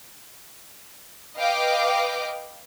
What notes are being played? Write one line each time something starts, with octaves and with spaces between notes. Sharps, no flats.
B4 D#5 F5 G5 D6